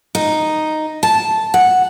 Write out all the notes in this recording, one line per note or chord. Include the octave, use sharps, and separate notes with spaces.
D#4
A5
F#5